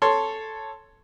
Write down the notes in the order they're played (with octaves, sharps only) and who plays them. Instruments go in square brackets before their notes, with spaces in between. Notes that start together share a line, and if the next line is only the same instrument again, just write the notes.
[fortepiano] A4 C#5 C6